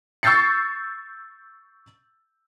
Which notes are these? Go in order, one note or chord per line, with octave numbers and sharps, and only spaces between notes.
C#6 E6 G6 A6 C7 C#7